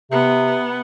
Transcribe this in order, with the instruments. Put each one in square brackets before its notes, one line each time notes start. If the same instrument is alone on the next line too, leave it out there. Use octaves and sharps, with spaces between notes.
[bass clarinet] C3 [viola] B3